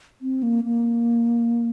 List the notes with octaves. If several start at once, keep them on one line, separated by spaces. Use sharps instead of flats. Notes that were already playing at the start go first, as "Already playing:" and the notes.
C4
A#3
A#3